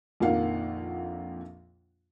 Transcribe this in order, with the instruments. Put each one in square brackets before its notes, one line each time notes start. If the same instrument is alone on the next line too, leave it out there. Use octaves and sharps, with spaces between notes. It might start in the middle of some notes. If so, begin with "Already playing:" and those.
[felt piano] A#1 F2 D#3 A#3 F5 F#5